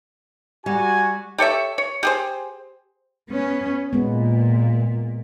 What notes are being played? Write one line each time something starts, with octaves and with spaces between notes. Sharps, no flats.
G3 F#4 G#5
G4 A4 C#5 E5
C#5
G4 G#4 C5
B3 C#4
A#2 G#3 B3